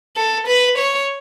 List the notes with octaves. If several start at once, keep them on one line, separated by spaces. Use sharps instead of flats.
A4
B4
C#5